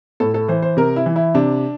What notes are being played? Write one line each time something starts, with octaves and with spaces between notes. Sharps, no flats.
A2 A4
A4
E3 C5
C5
C3 A#4
E4
E3
E4
C3 D4